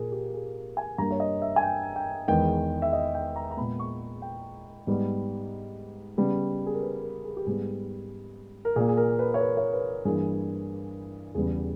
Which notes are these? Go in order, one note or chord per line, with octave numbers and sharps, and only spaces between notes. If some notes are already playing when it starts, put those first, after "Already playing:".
Already playing: A#2 A#3 G#4 A#4
G4
G#4
G#5
G2 G3 A#3 A#5
C#5
D#5
E5
G#5
G5
G5
E2 D#3 G#3 B3 G5
E5
D#5
G5
A#5
A#5
A#2 G#3 B3 B5
C#6
G5
G#2 G3 B3
C#3 G3 B3
G#4
A#4
B4
A#4
G#4
G4
G#2 G3 B3 G#4
A#4
A#2 A#3 G#4
G#4
A#4
B4
C#5
B4
C#5
B4
G2 E3 A#3 G#4
E2 C#3 G3 B3 G#4